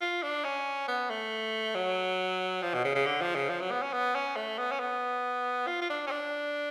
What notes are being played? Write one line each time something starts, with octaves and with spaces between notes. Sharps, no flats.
F4
D4
C#4
B3
A3
F#3
F3
B2
C#3
C#3
D3
F3
C#3
F3
F#3
B3
C#4
B3
C#4
A3
B3
C#4
B3
F4
F4
D4
C#4
D4